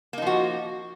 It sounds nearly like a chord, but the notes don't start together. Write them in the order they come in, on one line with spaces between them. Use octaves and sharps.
A#3 D#4 F3 F#4